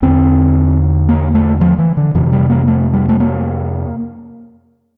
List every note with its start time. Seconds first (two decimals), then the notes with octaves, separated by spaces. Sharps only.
0.02 E2 D3 C4
1.09 A#3
1.35 A3
1.61 F3
1.79 E3
1.97 D3
2.15 F2 C3 E3
2.32 G3
2.50 A#3
2.67 A3
2.93 G3
3.09 A3
3.20 A#3